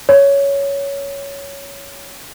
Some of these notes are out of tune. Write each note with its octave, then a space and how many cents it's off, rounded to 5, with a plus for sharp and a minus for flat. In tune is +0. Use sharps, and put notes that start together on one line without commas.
C#5 +10